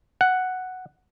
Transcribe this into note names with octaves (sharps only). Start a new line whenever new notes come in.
F#5